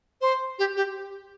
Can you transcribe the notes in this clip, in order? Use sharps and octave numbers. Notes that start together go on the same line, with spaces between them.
C5
G4
G4